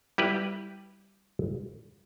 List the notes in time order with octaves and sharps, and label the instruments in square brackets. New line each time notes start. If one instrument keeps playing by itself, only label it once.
[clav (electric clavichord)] G3 E4 G4 B4